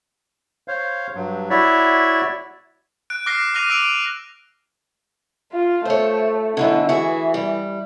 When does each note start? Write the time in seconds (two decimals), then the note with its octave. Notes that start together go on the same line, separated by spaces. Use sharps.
0.68 C5 C#5 F5
1.15 G2 F#3
1.50 E4 F#4 C#5 D5 E5
3.10 F#6 D7
3.26 D6 F6 F#6 A#6 C7
3.54 D6 F6 F#6 A#6 D#7 F7
3.69 D6 E6 A#6 D7 F7
5.52 F4
5.85 A3 C5 C#5
6.57 F#2 B2 D3 E4
6.89 E3 F#4 G#4 E5
7.34 G3